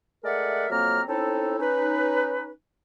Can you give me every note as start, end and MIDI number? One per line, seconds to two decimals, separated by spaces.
0.24 0.65 56
0.24 0.65 57
0.24 0.65 70
0.24 0.65 74
0.24 0.65 76
0.24 0.65 78
0.70 1.01 41
0.70 1.01 54
0.70 1.01 58
0.70 1.01 60
0.70 1.01 82
0.70 1.01 89
1.07 1.59 60
1.07 1.59 61
1.07 1.59 63
1.07 1.59 64
1.07 1.59 69
1.59 2.50 61
1.59 2.50 63
1.59 2.50 71